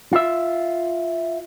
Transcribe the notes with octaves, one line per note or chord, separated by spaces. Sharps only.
F4 E5